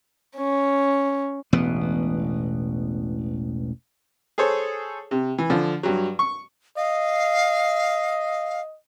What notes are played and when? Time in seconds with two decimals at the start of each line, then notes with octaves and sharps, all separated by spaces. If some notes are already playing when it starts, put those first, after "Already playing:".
0.37 C#4
1.53 E1 A1 B2 B3
4.38 G#4 A4 C5 C#5
5.11 C3
5.38 E3
5.50 D3 F3
5.83 G2 F#3
6.19 C#6
6.77 D#5 F5